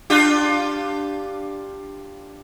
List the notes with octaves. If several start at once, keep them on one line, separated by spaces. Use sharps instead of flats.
D4 F4 G4